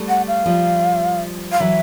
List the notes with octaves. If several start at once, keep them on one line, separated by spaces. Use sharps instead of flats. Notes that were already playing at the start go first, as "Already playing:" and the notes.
Already playing: G3 A3
F#5
F5
F3 G3
F5
E3 F#3 E5